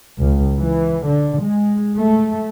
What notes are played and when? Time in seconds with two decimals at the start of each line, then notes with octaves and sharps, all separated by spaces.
0.18 C#2
0.58 E3
1.05 D3
1.42 G#3
1.96 A3